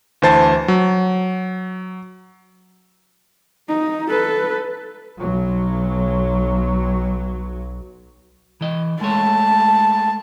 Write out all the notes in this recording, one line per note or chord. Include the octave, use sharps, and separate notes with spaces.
D2 E3 C5 A5 A6
F#3
D#4
A4 B4
B1 F#3
E3 D#5
G#3 A3 C#5 A5